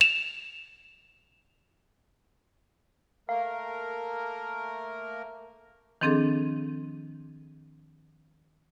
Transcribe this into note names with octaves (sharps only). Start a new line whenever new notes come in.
E7 F7
A3 A#3 A#4 F5
D#3 F3 C4 D4 G#4 A4